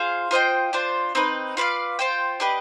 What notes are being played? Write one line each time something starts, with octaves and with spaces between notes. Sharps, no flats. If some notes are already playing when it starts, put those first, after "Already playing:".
Already playing: F4 G#4 C5 F5
F4 C5 D#5 G5
D4 F4 C5
C4 D#4 B4 D#5
F4 B4 D5 F5
F4 C5 G5
D4 G4 B4 D#5